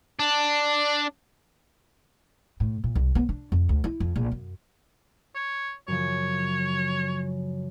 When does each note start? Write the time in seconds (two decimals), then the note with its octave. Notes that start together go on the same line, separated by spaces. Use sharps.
0.20 D4
2.60 A2
2.84 A#2
2.95 C2
3.15 B3
3.29 D4
3.52 F2
3.69 D2
3.84 E4
4.00 F2
4.16 A#1
4.32 F#2
5.35 C#5
5.88 F#2 C#3 F3 C#5